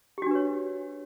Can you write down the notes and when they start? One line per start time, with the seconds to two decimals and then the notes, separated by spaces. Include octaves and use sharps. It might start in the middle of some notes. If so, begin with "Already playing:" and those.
0.18 G4
0.22 F#4
0.26 D4
0.31 B4
0.35 C#5